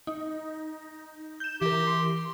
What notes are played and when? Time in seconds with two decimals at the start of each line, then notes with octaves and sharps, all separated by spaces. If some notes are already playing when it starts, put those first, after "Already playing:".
0.07 D#4
1.40 G6 E7
1.61 E3 G4 A#4
1.87 C6